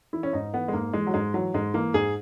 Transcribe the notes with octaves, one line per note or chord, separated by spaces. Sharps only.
E3 E4
C#4
G#2 D#4
E3 B3
G#3
G#2 A#3
E3 G#3
F#3
G#2 G#3
E3 F#3
G#2 G#3
E3 A#3
G#2 G#4